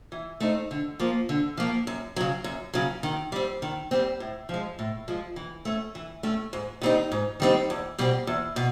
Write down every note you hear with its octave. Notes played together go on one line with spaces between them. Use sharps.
E3
A3 C4 D#4
D3
F3 A#3
D3
F3 A#3
F#2
C#3 F#3
F#2
C#3 F#3
D#3
G3 C4
D#3
G3 C4
A2
F3 G#3
A2
F3 G#3
E3
A3 C#4
E3
A3 C#4
G#2
D#3 G3 C4 D#4
G#2
D#3 G3 C4 D#4
E2
B2 G3 C4
E2
B2